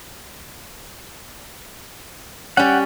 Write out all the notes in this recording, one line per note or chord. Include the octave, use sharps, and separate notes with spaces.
G3 C#4 F#5 G5